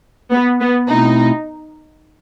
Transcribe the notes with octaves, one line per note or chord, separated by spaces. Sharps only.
B3
B3
B2 A3 C4 D#4 E4